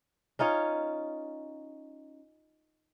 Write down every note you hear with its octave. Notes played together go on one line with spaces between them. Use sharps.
C#4 D#4 F4 C#5